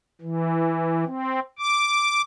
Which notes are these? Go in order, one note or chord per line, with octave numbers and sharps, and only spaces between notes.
E3
C4
D6